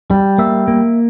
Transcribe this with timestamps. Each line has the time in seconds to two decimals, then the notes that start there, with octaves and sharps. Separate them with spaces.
0.11 G3
0.38 A#3 E5
0.68 A#3